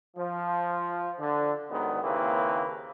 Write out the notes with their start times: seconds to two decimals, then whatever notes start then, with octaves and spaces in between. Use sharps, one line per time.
0.17 F3
1.19 D3
1.70 G#2 D3 D#3 F#3 B3
2.03 D#2 C#3 A#3 C4 E4 B4